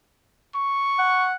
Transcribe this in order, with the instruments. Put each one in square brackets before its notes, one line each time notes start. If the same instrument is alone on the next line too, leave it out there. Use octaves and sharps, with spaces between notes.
[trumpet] C#6
[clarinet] F#5